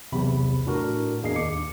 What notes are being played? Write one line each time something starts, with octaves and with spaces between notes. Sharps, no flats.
B1 E2 C3 B5
A2 D4 F#4 A#4
E2 A#3 D4 G#4 D#5 C7
D#2 D6 C#7